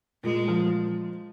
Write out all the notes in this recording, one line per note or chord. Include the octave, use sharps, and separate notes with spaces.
A#2 G#3
F3